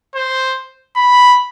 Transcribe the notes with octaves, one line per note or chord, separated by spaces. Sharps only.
C5
B5